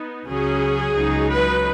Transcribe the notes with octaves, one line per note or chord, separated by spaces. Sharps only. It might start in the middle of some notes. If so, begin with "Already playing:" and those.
Already playing: B3 D#4
C#2 C#3 F#3 C#4 G#4
C#2 C#3 F#3 D#4
B4